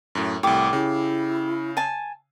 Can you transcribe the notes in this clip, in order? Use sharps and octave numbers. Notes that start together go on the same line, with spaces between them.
F#2 A2
C2 A2 G4 D6
C#3 E4
G#5 A5